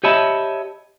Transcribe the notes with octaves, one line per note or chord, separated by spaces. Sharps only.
G4 C#5 D#5 E5 A5 B5